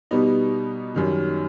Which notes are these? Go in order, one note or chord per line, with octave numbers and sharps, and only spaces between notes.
B2 G3 B3 D#4
F#2 D#3 G3